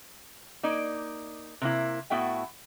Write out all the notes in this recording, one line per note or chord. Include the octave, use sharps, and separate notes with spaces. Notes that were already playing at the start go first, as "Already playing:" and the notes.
A#3 D#4 D5
C3 A#3 E4
A2 B3 F#4 E5 G5